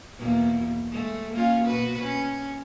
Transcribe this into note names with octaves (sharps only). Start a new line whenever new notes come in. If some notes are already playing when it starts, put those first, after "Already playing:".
E2 B2 A#3
G#3 A3
A#3 C#4 F4
B2 F#4 B4
C#4